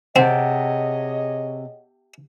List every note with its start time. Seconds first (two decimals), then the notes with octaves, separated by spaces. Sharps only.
0.16 C3 C4 G#4 C#5 D#5 F#5 G5 A5